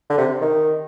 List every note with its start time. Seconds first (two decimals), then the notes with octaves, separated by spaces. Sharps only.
0.10 D3
0.18 C3
0.41 D#3